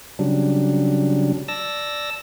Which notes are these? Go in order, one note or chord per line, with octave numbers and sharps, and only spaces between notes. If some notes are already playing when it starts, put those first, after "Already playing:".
C#3 F#3 G3 D4
D5 A5 E6 A#6